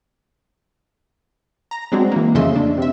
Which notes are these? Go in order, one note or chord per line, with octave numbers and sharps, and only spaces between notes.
A#5 A#6
F#3 G#3 C4 D4 F#4
E3 A#3
F2 C#3 A3 D#5 E5 C6
D4
C3 E5